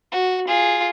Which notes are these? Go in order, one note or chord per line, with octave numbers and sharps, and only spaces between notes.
F#4
F4 G#4